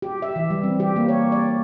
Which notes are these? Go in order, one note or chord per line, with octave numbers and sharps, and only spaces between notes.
G4
E5
E3
G3
C4
G4
A#3
C#5
D5